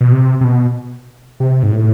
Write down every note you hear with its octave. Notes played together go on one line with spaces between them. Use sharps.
B2
C3
C3
B2
C3
G#2
A2